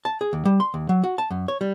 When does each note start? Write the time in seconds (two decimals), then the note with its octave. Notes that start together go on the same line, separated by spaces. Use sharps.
0.05 A5
0.21 G#4
0.33 D#2
0.45 G3
0.60 C6
0.74 D#2
0.89 F#3
1.04 F#4
1.18 A5
1.31 F#2
1.48 C#5
1.61 G3